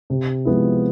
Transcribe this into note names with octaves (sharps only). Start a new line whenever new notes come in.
C3
F3 G#3 B3 E4